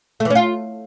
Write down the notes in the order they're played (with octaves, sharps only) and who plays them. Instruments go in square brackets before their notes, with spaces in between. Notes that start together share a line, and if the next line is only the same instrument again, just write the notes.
[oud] A3
E3
C#4
F4